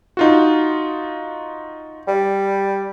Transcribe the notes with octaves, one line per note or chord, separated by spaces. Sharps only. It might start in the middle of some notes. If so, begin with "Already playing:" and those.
D#4 F4 F#4
G3